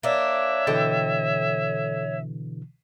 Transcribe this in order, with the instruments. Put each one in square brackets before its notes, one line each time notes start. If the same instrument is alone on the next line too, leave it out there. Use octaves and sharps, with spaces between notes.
[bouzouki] A#3 D4 [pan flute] C#5 [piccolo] E5
[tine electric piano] B2 D3 E3 [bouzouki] A4 D#5 G5